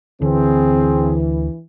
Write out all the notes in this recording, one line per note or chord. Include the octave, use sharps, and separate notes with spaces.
D2 D3 E3 C4 G#4